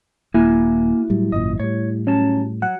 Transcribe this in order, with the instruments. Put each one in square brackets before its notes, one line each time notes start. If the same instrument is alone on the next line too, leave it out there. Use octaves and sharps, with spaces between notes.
[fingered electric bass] D#1 [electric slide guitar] A#3 F#4 G#5 [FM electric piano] E4
[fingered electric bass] A2 F#3 G3
[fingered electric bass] G#1 F#2 A#2 [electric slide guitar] D#5
[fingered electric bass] A2 G3 [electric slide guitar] C#5
[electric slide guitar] F#3 A5 [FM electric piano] C#4
[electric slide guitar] F#3 [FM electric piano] F#5